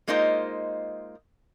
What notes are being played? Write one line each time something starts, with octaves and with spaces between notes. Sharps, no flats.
G#3 A#3 D#4 F4 C5 D#5